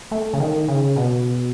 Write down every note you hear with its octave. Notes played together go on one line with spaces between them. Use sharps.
A3
C#3
D#3
C#3
B2